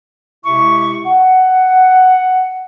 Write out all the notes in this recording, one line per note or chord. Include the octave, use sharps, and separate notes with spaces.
C3 G#3 E4 G4 E5 C#6
F#5